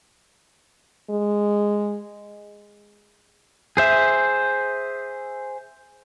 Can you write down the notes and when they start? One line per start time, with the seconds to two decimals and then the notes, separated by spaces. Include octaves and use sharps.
1.10 G#3
3.77 G#4 C5 E5